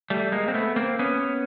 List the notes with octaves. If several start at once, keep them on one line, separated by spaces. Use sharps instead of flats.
G3 A3
G#3 A#3
C4
A3 B3
A#3 C4
B3 C#4